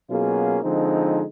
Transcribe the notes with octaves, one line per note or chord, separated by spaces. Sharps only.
B2 F#3 A#3 C#4 F4 G#4
D3 F3 G#3 C4 D#4